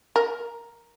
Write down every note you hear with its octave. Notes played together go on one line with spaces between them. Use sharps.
A#4